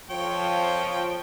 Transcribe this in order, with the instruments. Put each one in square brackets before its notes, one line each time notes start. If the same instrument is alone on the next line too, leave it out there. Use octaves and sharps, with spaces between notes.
[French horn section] F2 F3 [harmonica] C#5 G5